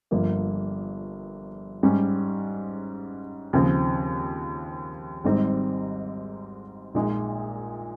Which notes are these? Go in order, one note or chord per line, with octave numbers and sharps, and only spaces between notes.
G1 G2 F3 A#3
G#2 G3 C#4
D#2 C#3 F3 C4
G#1 G#2 G3 C4 D#4
A#1 A#2 G#3 D#4